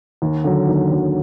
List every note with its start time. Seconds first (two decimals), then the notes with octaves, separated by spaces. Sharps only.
0.22 D#2
0.44 D3 F#3
0.68 D#2
0.91 D3 F#3